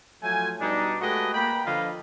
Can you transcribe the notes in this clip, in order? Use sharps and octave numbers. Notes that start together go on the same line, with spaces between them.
F3 F#3 A3 F4 G#5
B2 G3 D4 D#4
G#3 A3 F#4 G4 B4 D#5
A#3 G5 B5
D3 F3 F4 B4 D#5 F5